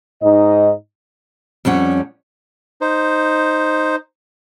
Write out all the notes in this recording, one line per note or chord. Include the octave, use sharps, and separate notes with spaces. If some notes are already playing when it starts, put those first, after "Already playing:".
G#2 D#4 D#5
F2 G3 C#4 F#5
D#4 C5